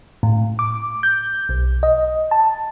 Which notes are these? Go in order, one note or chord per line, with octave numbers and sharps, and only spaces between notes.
A2
D6
G6
B1
D#5
A5